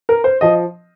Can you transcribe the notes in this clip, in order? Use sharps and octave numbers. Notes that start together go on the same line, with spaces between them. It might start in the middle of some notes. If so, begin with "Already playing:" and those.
A#4
C5
F3 D#5